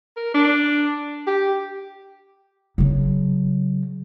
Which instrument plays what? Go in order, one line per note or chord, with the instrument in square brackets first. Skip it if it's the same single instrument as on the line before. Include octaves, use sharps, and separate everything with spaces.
[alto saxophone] A#4
D4
G4
[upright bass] C#3 F#3